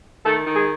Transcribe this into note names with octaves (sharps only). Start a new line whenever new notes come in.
D#3 A3 A4
D#3
G#3 G#4